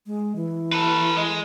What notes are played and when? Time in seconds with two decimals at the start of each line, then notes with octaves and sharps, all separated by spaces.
0.07 G#3
0.36 E3
0.72 A4 B4
1.17 G#3